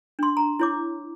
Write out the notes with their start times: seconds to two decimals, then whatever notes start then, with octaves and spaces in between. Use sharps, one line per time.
0.19 D4 C6
0.37 A#5
0.60 E4 C#5 D6